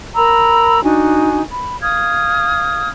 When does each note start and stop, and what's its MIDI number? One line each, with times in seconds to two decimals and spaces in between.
0.15 0.82 70
0.15 0.82 82
0.15 0.82 83
0.15 0.82 88
0.83 1.40 62
0.83 1.40 63
0.83 1.40 66
0.83 1.40 80
1.51 1.76 83
1.82 2.88 77
1.82 2.88 87
1.82 2.88 89
1.82 2.88 92